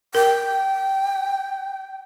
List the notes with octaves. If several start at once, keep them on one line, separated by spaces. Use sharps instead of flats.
A#4 G5